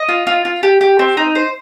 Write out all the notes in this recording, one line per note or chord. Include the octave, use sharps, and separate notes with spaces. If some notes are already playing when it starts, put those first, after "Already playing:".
Already playing: D#5
F4
F4
F4
G4
G4
C4
D#4
C5